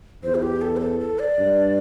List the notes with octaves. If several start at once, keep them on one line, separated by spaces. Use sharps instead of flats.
E2 C5
E4
G4
A4
C5
A4
A4
D5
G2